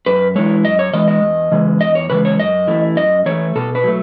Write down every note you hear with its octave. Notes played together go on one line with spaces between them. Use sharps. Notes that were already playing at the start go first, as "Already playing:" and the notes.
F#2 B4
E3 G#3 C#5
F#2 D#5
C#5
E3 G#3 D#5
D#5
E2
C#3 E3 G#3
E2 D#5
C#5
C#3 E3 G#3 B4
C#5
F#2 D#5
E3 A3
F#2 D#5
E3 A3 C#5
B2 A4
B4
F#3 A3